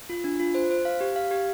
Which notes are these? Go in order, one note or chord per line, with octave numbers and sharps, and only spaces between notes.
F4
D4
F4
C5
C5
F5
G4
F5
G4